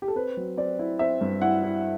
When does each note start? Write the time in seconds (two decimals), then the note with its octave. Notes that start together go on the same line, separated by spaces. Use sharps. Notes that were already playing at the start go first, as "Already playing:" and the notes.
0.02 G4
0.08 A4
0.16 C4 B4
0.37 F#3
0.57 C4 D5
0.79 E4
0.99 C4 E5
1.21 G2
1.42 E4 F#5
1.63 E4